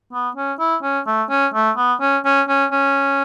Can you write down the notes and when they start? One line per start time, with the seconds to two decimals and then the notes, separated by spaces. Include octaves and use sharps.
0.13 B3
0.36 C#4
0.59 E4
0.83 C#4
1.07 A3
1.30 C#4
1.54 A3
1.77 B3
2.01 C#4
2.25 C#4
2.49 C#4
2.72 C#4